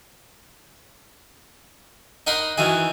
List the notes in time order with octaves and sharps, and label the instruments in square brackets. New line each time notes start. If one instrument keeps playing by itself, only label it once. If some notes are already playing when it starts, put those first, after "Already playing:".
[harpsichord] D#4 A#4 F#5 B5 C6
D#3 E3 F#4 G#4